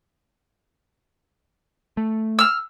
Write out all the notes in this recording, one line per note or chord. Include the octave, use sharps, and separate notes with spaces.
A3
E6 F6